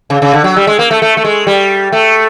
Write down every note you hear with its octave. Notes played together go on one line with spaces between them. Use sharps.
C#3
C#3
D3
F#3
G3
G#3
A#3
A3
A3
A3
G#3
G3
A3